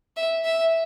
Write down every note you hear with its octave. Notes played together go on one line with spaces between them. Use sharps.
E5
E5